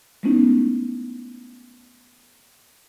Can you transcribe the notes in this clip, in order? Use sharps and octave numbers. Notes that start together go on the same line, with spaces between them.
G#3 A3 B3 C#4 D#4 E4